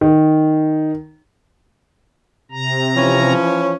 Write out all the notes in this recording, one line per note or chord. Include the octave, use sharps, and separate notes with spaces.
D#3
C3 A#5
E3 F3 C#4